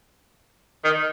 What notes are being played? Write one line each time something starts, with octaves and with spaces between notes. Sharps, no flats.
D#3